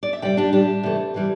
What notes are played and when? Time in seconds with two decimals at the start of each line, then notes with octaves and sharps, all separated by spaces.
0.03 D5
0.13 E5
0.22 C3 G3 D5 G5
0.37 D4 G4
0.53 A2 G3 D4 G4
0.83 C3 E3 A3
1.14 C3 E3 G3